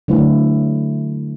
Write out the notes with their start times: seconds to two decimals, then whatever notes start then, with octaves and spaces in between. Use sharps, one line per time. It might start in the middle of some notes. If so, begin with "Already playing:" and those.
0.08 D3 F#3 A3 E4 B4